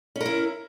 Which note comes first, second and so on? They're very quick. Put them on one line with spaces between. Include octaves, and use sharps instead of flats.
C#4 A#4 E4